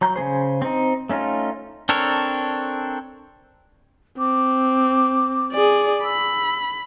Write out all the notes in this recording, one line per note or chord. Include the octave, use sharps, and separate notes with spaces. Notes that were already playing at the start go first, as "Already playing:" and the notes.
F#3 A#5 G6
C#3 A#3 G#4 C5
C4 D#4
A3 C#4 D#4 F4
C4 D4 A4 A#4 C#5
C4 D6
G#4 D5
B5 E6